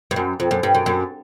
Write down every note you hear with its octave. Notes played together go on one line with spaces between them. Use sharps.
G2
F#2
F2
F#2
G2
F#2
F#2